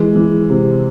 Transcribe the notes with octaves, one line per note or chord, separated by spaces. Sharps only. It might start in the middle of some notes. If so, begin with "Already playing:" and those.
Already playing: E3 G#3
E3
C3